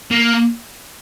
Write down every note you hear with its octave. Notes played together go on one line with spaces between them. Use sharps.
A#3